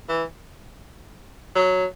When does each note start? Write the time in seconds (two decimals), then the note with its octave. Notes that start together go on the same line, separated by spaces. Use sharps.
0.09 E3
1.56 F#3